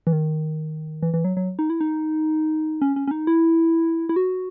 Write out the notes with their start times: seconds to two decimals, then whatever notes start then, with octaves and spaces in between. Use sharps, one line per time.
0.07 E3
0.13 D#3
1.03 E3
1.14 E3
1.24 F#3
1.37 F#3
1.59 D#4
1.70 E4
1.81 D#4
2.82 C#4
2.96 C#4
3.08 C#4
3.11 D#4
3.27 E4
4.09 E4
4.16 F#4